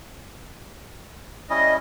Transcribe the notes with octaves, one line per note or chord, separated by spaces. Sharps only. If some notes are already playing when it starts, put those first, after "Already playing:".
G3 C#4 E4 D#5